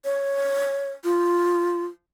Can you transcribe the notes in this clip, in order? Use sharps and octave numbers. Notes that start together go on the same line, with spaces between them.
C#5
F4